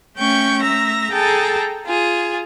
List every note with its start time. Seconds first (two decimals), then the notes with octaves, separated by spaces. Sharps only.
0.16 A3 C#4 G5 C#6 G6
0.61 A3 E5 A#5 A#6
1.11 G#4 A4 G5 A5 A#5
1.86 F4 G#4